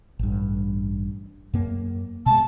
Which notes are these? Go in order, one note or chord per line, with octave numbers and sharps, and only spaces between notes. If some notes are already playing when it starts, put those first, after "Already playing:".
A1 G2
F#2 A#3
B2 G#3 A5